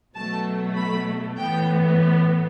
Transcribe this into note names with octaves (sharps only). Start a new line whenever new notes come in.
B2 F#3 A3 A5
B5
A2 E3 B3 G5